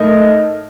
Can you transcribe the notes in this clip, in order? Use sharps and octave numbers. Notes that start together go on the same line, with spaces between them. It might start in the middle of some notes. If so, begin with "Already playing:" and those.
Already playing: A2 A3 D#4 A#4 D#5